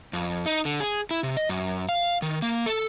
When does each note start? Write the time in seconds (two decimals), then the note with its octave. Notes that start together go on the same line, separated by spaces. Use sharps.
0.13 F2
0.46 D#4
0.65 D3
0.80 G#4
1.11 E4
1.23 C3
1.37 D#5
1.49 F#2
1.89 F5
2.22 D#3
2.42 A#3
2.66 A4